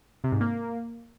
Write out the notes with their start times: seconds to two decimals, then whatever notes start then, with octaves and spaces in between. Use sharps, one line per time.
0.24 C3
0.32 G#2
0.41 A#3